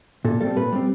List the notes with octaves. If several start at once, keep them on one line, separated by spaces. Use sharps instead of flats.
A#2 A4
G3 C4 A4
A#2 B4
G3 C4